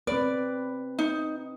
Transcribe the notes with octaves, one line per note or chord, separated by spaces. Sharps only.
C4 B4 D5
D#4